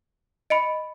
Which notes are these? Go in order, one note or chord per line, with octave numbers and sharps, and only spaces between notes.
D#5 B5 C#7 D7